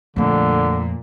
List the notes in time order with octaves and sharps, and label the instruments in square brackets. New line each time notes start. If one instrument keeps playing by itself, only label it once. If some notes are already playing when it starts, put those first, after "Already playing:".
[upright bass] F2 A3 [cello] A#2 [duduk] D3